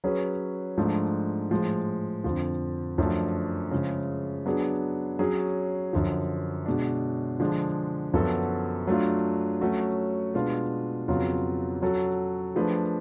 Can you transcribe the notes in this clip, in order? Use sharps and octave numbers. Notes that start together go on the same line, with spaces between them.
F#3 C#4 G#4 B4
G#2 F3 A3 D4
A2 F3 G#3
F2 D3 F3
F#2 F3 A3 D4
C#3 F3 G#3
F#3 B3 D4 G#4
F#3 C#4 G#4
F#2 D3 F3
B2 G#3 D4
D3 F3 G#3 D4 G#4
F#2 F3 B3 F#4 A4
F#3 A3 D4 F4
F#3 A3 C#4 F#4
B2 G#3 D4 F4 B4
F2 C#3 F#3 B3 F4
F#3 C#4 F#4 A4
F3 A3 D4 G#4 B4